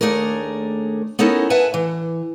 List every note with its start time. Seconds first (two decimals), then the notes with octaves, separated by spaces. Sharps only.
0.01 D#2 G#2 A3 D4 G#4 A#4
1.19 B3 C#4 D#4 E4 A4 A#4
1.50 B4 E5 F#5 G#5 A5
1.74 E3